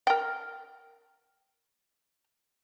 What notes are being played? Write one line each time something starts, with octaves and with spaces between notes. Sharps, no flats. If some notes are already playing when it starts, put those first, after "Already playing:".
A#4 G5